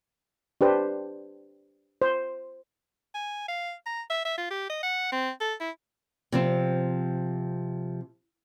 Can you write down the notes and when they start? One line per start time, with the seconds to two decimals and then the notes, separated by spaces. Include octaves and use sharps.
0.61 D4 G4 B4 C5
2.02 C5
3.15 G#5
3.48 F5
3.86 A#5
4.10 E5
4.25 E5
4.38 F4
4.51 G4
4.70 D#5
4.83 F#5
5.12 C4
5.41 A4
5.61 E4
6.32 C3 F3 C4